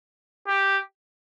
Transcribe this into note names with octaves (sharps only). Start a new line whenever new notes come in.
G4